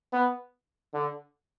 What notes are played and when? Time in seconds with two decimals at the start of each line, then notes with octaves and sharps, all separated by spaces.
0.13 B3
0.94 D3